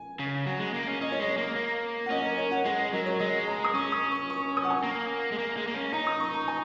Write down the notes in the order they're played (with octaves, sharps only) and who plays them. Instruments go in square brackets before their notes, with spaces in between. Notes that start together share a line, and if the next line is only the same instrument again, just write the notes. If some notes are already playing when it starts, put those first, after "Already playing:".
Already playing: [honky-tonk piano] G#5
[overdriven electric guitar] C#3
F#3
G#3
A#3
C#4
[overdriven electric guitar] C#4 [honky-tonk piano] D#5
[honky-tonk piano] C#5
[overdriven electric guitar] G#3 [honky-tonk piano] D#5
[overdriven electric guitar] A#3
A#3
[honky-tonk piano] F#5
[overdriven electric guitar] C#4 [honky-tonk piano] D#5
[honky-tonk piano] A#4
C#5
F#5
[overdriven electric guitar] G#3 [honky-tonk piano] F#5
[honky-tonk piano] D#5
[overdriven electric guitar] F#3 [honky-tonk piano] A#4
[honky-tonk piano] C#5
[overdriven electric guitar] G#3 [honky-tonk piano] D#5
[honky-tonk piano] A#5
D#6
[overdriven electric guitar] C#4 [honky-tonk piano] C#6
[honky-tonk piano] D#6
C#6
C#6
D#6
F#5
G#5
[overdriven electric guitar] A#3
G#3
A#3
G#3
A#3
C#4
[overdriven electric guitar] D#4 [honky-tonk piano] A#5
[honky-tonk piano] D#6
C#6
A#5
G#5